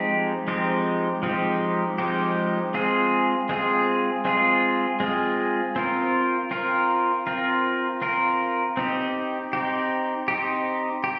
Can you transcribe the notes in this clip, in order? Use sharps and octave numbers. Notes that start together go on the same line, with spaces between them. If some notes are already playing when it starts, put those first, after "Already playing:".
Already playing: F3 G#3 C4 D#4 G4
F3 G#3 C4 D#4 G4
F3 G#3 C4 D#4 G4
F3 G#3 C4 D#4 G4
G#3 C4 F4 G#4
G#3 C4 F4 G#4
G#3 C4 F4 G#4
G#3 C4 F4 G#4
C4 F4 A#4
C4 F4 A#4
C4 F4 A#4
C4 F4 A#4
C4 D#4 G4
C4 D#4 G4
C4 D#4 G4
G4